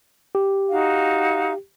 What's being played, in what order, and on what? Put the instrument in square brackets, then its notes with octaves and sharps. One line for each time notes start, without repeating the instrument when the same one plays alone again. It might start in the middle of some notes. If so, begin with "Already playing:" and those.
[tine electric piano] G4
[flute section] D#4 F#4 F5